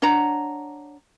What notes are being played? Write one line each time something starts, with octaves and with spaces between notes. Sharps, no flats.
D4 C#5 F#5 A#5